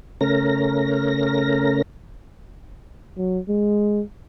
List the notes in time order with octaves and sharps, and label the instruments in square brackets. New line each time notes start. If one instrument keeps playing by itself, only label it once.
[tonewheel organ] C#3 A3 C#4 A#4 A#6
[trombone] F#3
G#3